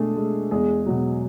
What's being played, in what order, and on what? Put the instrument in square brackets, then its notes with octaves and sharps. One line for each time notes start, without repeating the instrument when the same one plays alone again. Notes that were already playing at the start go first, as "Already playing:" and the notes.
Already playing: [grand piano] B2 G#3 A3 D4 G#4 A4
G#3
E2 G#3 G#4
B2 F#3